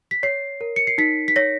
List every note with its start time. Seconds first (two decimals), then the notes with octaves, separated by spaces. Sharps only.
0.11 B6
0.23 C#5 C7
0.61 A#4
0.76 C#7
0.87 C7
0.98 D#4 B6
1.28 B6
1.36 C#5 A#6